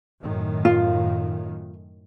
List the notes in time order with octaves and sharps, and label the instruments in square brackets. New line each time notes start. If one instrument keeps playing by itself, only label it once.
[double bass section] F#2 A2 D#3
[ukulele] F4